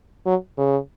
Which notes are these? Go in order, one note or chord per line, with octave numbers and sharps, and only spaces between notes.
F#3
C#3